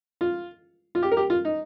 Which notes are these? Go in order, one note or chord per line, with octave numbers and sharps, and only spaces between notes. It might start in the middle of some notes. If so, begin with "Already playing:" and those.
F4
F4
G4
A#4
G4
F4
D#4